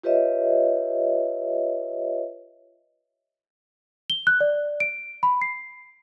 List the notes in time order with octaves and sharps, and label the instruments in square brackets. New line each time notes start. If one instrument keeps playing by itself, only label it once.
[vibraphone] F4 G4 B4 C#5 D#5 E5
[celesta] G7
F#6
D5
D7
B5
C7